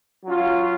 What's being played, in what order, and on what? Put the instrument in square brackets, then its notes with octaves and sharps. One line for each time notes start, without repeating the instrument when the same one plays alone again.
[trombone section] F#3 C#4 F4